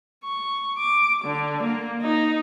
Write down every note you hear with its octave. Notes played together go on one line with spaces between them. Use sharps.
C#6
D6
D3
A#3
D#4